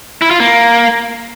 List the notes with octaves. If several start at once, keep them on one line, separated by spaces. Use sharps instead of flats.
E4
F4
A#3